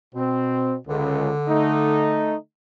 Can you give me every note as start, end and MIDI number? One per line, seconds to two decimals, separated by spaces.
0.15 0.78 47
0.15 0.75 60
0.88 1.31 37
0.88 2.42 50
1.49 2.35 57
1.49 2.35 63